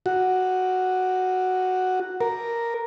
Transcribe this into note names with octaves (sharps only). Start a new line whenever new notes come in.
F#4
A#4